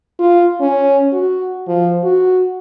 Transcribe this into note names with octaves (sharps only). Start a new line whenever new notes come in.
F4
C#4
F#4
F3
F#4